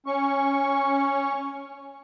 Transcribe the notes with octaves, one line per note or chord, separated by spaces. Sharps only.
C#4 C#6